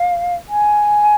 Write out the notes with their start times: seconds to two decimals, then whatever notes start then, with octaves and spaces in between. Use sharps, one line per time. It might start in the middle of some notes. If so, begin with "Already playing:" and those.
Already playing: F5
0.48 G#5